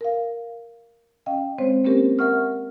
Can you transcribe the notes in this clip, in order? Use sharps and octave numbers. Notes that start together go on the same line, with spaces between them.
A#4 F5
C#4 D#5 F5 G5
G#3 C4 C5 C#5
A#3 C4 C#4 G4 A#4 C5
A#4 E5 F#5 C#6 F6